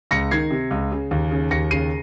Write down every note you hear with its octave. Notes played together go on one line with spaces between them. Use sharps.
C#2 A#6 C#7
D#3 G#6 C7
C3
C#2
C#3
D#2
C#3
D#2 A#6 C#7
C#3 C7 D#7